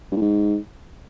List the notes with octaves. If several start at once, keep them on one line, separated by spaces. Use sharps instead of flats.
G2
A2
G#2